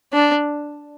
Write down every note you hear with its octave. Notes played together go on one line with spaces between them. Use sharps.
D4